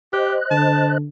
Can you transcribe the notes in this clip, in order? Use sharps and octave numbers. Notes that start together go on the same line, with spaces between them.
G4 C5 D#5 F#6
D3 A5